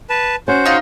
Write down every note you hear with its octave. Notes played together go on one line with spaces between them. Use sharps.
B4 A5
C#4 F#4 C5
D#4 F4